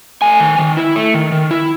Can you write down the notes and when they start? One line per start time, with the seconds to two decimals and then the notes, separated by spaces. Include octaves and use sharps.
0.22 A3 G#5
0.40 D#3
0.59 D#3
0.77 E4
0.96 A3
1.14 D#3
1.32 D#3
1.51 E4